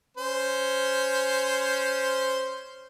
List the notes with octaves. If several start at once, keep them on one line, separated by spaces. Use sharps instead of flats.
C#4 C5